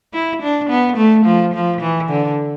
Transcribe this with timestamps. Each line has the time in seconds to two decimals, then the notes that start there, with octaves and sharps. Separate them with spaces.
0.14 E4
0.42 D4
0.70 B3
0.97 A3
1.25 F3
1.54 F3
1.81 E3
2.10 D3